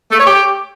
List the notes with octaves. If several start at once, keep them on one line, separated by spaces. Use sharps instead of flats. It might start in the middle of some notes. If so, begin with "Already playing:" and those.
A3
C#5
G4